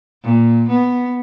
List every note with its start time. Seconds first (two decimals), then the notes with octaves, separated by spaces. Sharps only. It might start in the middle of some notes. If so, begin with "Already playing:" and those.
0.23 A#2
0.69 B3